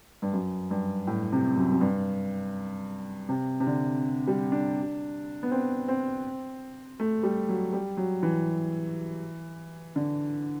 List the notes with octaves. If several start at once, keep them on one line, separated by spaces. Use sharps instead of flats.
G2
F#2
G2
A2
C3
F#2
F#2
G2
C3
C3
D3
G3
D4
B3
C4
C4
A3
G3
F#3
G3
F#3
E3
D3